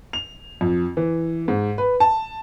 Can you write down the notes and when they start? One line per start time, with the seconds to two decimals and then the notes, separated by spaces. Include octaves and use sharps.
0.13 F7
0.61 F2
0.97 E3
1.48 G#2
1.78 B4
2.00 A5